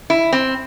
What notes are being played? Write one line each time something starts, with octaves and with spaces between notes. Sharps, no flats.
E4
C4